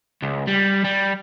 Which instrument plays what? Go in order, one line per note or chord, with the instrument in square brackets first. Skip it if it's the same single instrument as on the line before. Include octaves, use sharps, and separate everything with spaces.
[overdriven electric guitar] C#2
G3
G3